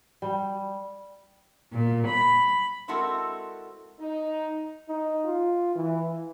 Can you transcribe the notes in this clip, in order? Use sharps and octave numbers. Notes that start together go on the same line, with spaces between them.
G3
A#2
B5
G#3 C4 E4 F#4 A4 A#4
D#4
D#4
F4
E3